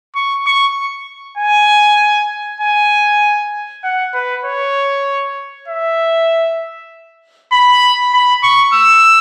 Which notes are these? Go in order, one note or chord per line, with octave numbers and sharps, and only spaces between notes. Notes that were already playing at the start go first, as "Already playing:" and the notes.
C#6
C#6
G#5
G#5
F#5
B4
C#5
E5
B5
B5
C#6
E6